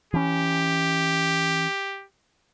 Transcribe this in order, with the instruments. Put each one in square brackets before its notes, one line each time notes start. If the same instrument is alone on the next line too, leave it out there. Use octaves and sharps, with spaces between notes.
[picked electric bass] E3 C#4 [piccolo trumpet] G4